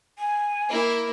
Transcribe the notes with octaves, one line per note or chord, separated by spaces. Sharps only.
G#5
A#3 E4